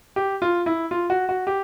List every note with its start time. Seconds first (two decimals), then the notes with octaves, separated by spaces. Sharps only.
0.16 G4
0.42 F4
0.66 E4
0.91 F4
1.10 F#4
1.29 F#4
1.47 G4